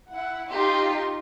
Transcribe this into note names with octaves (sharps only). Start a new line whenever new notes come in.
E4 F#5
D#4 F4 G4 C6